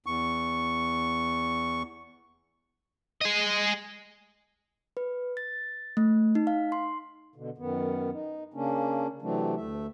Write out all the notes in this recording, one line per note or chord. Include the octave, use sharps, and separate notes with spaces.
E2 C#6
G#4 D#5
B4
A6
A3
D#4
F5
C6
B2 D3
F#2 D#3 B3
D#4
C#3 A#3 C#4 D4
C3 E3 F#3 A3 C4 D4
D2 A3 E5